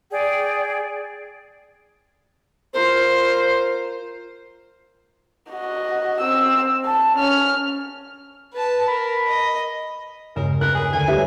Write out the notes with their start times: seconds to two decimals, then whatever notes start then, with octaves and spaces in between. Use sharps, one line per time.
0.11 G#4 D5 G5
2.74 F4 A#4 C5
5.51 F#4 D#5
6.21 C4 E6
6.85 A5
7.15 C#4 F6
8.53 B4 A5
8.88 A#4 B5
9.28 D#5
10.36 E2 G2 C#3 G#3 C4 A#4
10.61 A#4 B4 F#6
10.75 G#4 B4 G#5
10.93 D2 G#5
11.08 C#2 G3 B4 E5